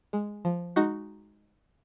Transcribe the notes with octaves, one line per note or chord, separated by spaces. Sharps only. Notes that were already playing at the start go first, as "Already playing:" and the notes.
G#3
F3
G#3 D#4 F#4